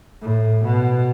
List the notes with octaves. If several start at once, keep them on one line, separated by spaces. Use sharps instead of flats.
A2
B2